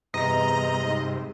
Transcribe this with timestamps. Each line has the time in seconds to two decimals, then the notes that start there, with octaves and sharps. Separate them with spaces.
0.14 E2 G2 C3 D#5 A#5
0.84 G#2